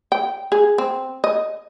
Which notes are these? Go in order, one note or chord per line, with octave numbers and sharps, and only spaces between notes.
G5
G#4
C4
D#5